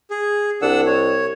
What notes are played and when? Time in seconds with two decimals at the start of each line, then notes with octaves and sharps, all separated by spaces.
0.11 G#4
0.62 C2 D4 F#5 E6
0.86 C#5